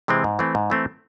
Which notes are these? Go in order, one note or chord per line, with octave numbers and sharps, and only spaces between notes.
C3 E3 G#3 C4
G#2
E3 A3 C4
G#2
E3 A3 C4